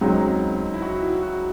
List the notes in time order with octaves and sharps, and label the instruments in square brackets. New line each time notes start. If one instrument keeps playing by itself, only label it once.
[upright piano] C#2 C#3 F#3 C4 [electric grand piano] D#4
[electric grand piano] E4
F#4
E4
F#4